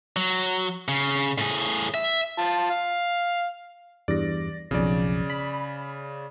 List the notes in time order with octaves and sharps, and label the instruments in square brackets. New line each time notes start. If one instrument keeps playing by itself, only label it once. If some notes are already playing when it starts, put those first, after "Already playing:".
[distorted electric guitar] F#3
C#3
A2 G#4
E5
[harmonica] F4 A5
F5
[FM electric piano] E2 G2 [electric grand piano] D5 A#6
[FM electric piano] B1 F2 [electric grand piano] C#3 D5
[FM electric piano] B5